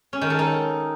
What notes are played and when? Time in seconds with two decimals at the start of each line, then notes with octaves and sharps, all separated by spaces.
0.13 C#4
0.21 D#3
0.30 A4
0.39 D#4